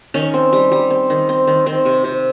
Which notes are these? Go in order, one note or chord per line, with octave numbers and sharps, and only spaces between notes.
D#3 C#4
C4
G3
G3
C4
D#3
C4
D#3
D#3 C4
C3
C3